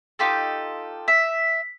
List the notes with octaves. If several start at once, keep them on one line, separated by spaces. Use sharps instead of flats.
D#4 F4 G4 A4
E5